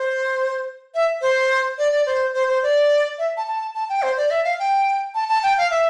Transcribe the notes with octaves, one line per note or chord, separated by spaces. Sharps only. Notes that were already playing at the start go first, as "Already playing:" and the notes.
Already playing: C5
E5
C5
D5
D5
C5
C5
C5
D5
E5
A5
A5
A5
G5
C5
D5
E5
F5
G5
A5
A5
G5
F5
E5